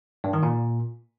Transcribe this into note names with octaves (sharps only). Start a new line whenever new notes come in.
G2
D#3
A#2